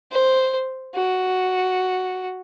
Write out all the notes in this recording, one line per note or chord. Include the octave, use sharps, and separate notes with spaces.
C5
F#4